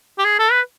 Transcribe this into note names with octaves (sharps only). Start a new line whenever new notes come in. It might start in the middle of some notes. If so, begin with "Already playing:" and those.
G4
G#4
A4
B4